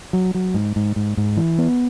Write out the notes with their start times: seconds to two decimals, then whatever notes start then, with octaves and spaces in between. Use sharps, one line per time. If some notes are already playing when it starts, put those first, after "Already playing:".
0.13 F#3
0.35 F#3
0.54 G#2
0.76 G#2
0.96 G#2
1.17 G#2
1.37 E3
1.58 B3